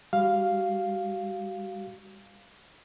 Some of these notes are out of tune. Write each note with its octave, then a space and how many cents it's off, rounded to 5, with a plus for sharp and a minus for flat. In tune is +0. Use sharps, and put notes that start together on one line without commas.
G3 +40 F#4 +35 F5 +0